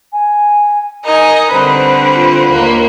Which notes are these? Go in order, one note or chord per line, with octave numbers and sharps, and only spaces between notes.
G#5
D#4 A#4 D#5 G#5
D3 G3 C4 B4 C5
F4
D#2 A#3